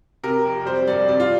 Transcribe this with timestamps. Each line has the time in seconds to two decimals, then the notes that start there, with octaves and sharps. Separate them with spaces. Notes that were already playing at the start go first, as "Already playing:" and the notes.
0.23 C3 A#4
0.45 F2
0.65 G3 C5
0.87 G2 D5
1.08 C3 D5
1.20 F4